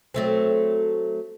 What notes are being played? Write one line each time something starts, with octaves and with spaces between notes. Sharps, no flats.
F#3 A3 C4